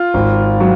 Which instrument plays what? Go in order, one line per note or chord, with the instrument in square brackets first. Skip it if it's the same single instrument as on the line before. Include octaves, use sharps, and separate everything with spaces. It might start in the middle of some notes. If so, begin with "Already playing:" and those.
Already playing: [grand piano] F4
G#1
F#3